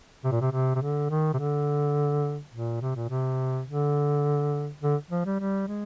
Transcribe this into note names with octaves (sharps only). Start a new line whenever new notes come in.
C3
A#2
C3
C3
C3
D3
D#3
C3
D3
A#2
C3
A#2
C3
D3
D3
F3
G3
G3
G#3